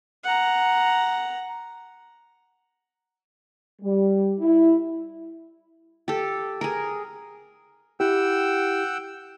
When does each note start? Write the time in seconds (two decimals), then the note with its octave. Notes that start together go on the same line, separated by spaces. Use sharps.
0.24 F#5 A#5
3.82 G3
4.39 E4
6.08 G4 A4
6.61 G#4 A#4
8.00 E4 G4 F#5 G5 E6